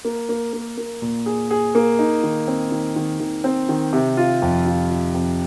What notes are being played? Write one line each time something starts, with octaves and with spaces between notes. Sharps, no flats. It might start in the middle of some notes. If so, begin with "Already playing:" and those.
A#3
A#3
A#3
A#3
A#2
G#4
G#4
A#3
D#4
D#3
C4
D#3
D#3
D#3
C4
D#3
C3
F4
F2
F4
F4
F2